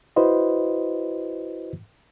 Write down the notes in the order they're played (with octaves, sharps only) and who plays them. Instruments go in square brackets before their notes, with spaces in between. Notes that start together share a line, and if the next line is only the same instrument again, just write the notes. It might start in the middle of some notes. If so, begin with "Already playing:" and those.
[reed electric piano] E4 F#4 B4 C5 D#5